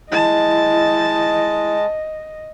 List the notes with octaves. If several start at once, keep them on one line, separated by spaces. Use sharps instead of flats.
G#3 E4 D#5 A5